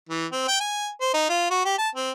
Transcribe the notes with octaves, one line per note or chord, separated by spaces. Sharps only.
E3
C4
G5
G#5
C5
D#4
F4
F#4
G4
A5
C4